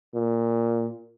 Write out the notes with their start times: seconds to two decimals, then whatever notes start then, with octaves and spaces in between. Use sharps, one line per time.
0.15 A#2